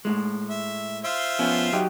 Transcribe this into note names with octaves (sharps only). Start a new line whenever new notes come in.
A2 G#3
E5
F4 C5 E5
F3 B3 C#4
F#3 D#4 G4